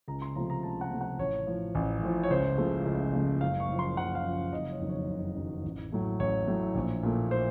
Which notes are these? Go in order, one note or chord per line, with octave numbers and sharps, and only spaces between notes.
C#2 A#5
C6
C3 F3 A3 A#5
A#5
C#2 A5
F#5
C3 F3 A3
F#5
A1 C#5
A2 F3
A1
A2 F3
C#5
C#2 C5
C#3 F3 A3
C#2
C#3 F3 A3
F#1 F5
C#6
F#2 F3
C6
F#1 F#5
F5
F#2 F3
F#1 D#5
C#5
F2 D#3 F#3
C#5
F#1
F2 D#3 F#3
A1
A2 F#3 A3
A1 C#5
A2 F#3 A3
A#1
A#2 A3
C5